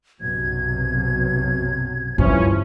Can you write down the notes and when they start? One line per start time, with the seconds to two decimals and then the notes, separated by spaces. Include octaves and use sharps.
0.21 B1 F#2 C3 G#6
2.18 G2 E3 F3 C#4